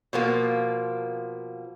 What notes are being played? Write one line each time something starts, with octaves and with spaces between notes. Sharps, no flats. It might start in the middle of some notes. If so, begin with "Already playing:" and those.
B2 F3 A#3